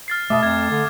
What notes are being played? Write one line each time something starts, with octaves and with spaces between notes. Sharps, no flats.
F6 A6 C7
B2 A3 E5 D6 D#6
F2 G#6
D3